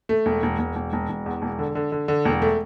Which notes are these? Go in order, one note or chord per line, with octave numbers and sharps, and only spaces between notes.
A3
E1
E1
E1
E1
E1
E1
E2
E1
D3
D3
D3
D3
E1
A3